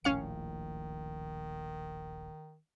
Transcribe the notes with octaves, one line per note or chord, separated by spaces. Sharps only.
D#1 A#1 A2 D#3 C#4 F5 C#7